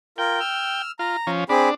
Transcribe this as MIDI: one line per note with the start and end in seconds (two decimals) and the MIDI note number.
0.18 0.39 65
0.18 0.39 70
0.18 0.82 79
0.40 0.91 88
0.40 0.91 89
0.99 1.17 65
0.99 1.30 82
1.27 1.44 53
1.27 1.44 61
1.49 1.69 60
1.49 1.74 62
1.49 1.69 68
1.49 1.69 83